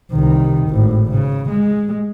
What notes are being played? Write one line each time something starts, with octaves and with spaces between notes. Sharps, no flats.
C2 D#3
G#1 A2
C#3
G#3